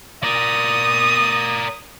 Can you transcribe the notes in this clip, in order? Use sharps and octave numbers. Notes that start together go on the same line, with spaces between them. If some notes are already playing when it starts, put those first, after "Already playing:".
A#4 D5 D#6